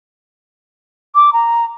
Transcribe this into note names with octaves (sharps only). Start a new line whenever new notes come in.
D6
A#5